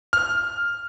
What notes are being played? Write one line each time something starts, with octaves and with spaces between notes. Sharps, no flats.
F6